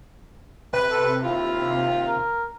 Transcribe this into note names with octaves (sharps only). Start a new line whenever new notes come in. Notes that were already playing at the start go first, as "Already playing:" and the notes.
C3 B4
A4
D#2 E4 F4
A#4